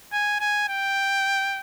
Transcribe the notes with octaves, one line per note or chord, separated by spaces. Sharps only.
G#5
G#5
G5